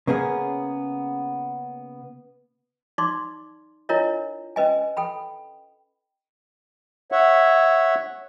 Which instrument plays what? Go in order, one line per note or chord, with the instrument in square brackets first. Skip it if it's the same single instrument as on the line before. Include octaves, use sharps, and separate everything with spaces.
[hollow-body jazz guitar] C#3 A#3 B3 C#4 G#4
[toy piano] D#4 D5 C6 D6
D4 E4 F4 A#4 C#5 D#5
C#4 B4 D#5 G#5
A4 G5 B5
[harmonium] C#5 E5 F#5